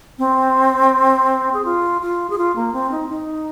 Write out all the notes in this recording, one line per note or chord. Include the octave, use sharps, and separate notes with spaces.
C4
G#4
F4
F4
G#4
F4
A#3
C4
D#4
D#4